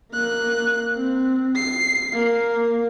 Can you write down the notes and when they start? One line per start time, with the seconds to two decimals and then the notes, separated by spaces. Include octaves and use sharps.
0.12 A#3 F#6
0.97 C4
1.56 C7
2.12 A#3